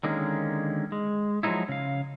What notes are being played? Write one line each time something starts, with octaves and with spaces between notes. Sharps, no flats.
D3 D#3 G#3 A#3 C#4
G#3
F3 F#3 G#3 C4 D#4 E4
C#3 F5